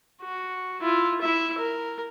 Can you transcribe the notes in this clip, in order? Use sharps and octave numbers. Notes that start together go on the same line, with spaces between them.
F#4
E4 F4
E4 E5
A#4